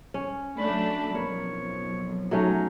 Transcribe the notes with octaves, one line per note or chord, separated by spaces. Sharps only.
C#4
F#3 A3 D4 B5
B1 F2 A#4 C#5
F#3 A3 C#4 D#4